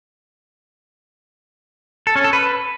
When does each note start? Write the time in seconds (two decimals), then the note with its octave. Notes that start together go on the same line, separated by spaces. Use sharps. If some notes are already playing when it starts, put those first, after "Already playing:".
2.07 A4
2.16 C#4
2.24 A4
2.33 B4